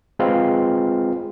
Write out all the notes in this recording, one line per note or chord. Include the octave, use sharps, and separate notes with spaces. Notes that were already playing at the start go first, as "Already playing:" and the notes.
G#3 C4 F4 G#4 B4 F5